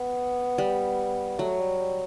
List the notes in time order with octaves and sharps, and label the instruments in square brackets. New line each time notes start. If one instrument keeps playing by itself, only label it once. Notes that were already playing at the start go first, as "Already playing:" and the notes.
Already playing: [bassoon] B3
[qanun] G3
[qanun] F#3 [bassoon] A3
[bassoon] G3
G3